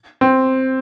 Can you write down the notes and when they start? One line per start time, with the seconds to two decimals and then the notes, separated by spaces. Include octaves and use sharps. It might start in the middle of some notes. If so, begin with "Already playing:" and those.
0.21 C4